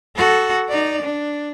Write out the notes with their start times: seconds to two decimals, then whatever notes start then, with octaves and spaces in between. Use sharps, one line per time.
0.16 F#4 A4
0.68 D#4 D5
1.01 D4